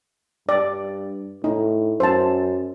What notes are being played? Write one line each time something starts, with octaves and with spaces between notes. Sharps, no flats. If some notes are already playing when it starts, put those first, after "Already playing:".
G2 D5
A2 D#4
F#2 C5 A5